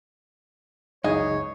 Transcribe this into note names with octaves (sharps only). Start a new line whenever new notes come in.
C#2 F#2 D#4 G#4 C#5